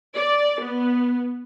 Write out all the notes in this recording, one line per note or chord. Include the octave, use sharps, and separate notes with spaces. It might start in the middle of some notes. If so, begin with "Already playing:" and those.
D5
B3